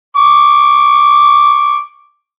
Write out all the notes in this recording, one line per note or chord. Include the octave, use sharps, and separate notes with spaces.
C#6 D6